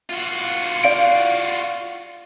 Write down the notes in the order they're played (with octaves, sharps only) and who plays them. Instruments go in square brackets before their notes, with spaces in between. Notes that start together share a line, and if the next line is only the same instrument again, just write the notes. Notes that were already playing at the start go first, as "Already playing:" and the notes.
[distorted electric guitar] F4 F#4
[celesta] D5 F5 D7